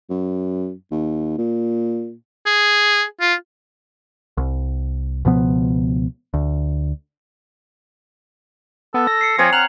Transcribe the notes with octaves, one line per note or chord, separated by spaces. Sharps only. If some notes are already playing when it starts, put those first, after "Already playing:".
F#2
D#2
A#2
G#4
F4
C2
C#2 B2 F3 B3
D2
B3 A4
A#6
C7 C#7
F3 C4 C#5 G#5
F#5 A#5 F6 F7 F#7